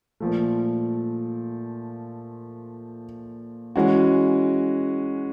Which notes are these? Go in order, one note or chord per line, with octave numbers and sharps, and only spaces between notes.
A#2 F3 A3
E3 G#3 C#4 F#4